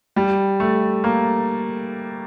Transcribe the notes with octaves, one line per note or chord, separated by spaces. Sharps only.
G3
A3
A#3